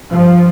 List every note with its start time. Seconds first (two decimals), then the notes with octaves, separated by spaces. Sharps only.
0.11 G2 F3